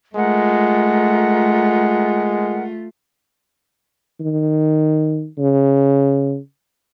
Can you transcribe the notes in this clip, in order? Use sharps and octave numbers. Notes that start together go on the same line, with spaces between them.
G#3 A3 F4 A#4 F#5
D#3
C#3